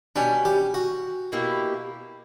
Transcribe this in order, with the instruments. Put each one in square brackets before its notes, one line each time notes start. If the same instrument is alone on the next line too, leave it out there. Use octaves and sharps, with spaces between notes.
[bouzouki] B2 G3 C#4 [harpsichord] D4
[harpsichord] G4
F#4
[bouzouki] B2 A#3 E4 G4